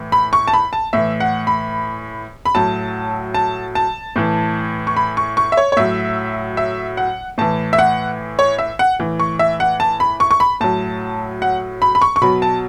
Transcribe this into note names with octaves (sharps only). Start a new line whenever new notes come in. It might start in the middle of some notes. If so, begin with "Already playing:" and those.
Already playing: A2 E3
B5
C#6
A5
B5
A5
A2 E3 E5
F#5
B5
B5
A2 F#3 A5
A5
A5
A2 E3
C#6
B5
C#6
C#6
E5
C#5
C#5
A2 F#3 E5
E5
F#5
A2 E3 A5
E5
F#5
C#5
E5
F#5
A2 E3
C#6
E5
F#5
A5
B5
C#6
C#6
B5
A2 F#3 A5
F#5
B5
B5
C#6
C#6
B2 F#3 B5
A5